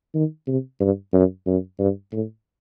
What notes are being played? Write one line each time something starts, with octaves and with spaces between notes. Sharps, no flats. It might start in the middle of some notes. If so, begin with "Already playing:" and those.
D#3
C3
G2
F#2
F#2
G2
A2